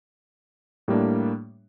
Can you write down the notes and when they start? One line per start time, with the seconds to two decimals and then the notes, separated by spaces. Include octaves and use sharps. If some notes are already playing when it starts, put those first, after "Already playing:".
0.88 A2 G3 A#3 D4